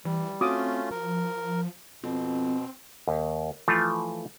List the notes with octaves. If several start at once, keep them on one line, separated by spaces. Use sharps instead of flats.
E3 G3
A3 C4 C#4 F4 F#4 D6 D#6
F3 A#4
F2 B2 C4
D#2
E3 F3 A3 F4